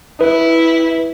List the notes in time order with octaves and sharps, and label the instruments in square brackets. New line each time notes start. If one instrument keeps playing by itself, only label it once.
[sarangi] E4 [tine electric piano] B4